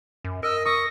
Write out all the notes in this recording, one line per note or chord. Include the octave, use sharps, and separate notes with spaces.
F#2
A#4 D#5 E6
C#6 D#6 A#6